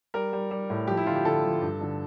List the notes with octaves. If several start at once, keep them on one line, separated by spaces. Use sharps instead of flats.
G3 A#4
G3
G3
A2
F3 G4
E4
D3 F4
G4
D3 A4
F3
G2
D3